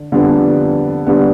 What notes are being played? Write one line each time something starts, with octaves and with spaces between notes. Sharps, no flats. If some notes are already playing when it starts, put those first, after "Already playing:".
Already playing: D3
F2 D3 G3 B3 D4
D3 G3 B3 D4